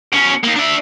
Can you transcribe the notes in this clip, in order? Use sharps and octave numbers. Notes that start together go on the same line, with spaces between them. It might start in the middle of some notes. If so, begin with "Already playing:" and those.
B2 C#4
A#3 D#4
D4 E5